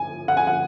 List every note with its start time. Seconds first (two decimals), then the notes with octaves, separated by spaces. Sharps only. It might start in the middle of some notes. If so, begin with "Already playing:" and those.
Already playing: G#5
0.28 F#5
0.37 G#5
0.47 F#5